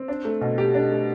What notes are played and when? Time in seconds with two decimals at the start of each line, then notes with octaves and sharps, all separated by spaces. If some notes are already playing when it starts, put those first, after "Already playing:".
Already playing: C4
0.08 D4
0.25 A3
0.41 B2
0.58 G4
0.74 D4
0.91 A3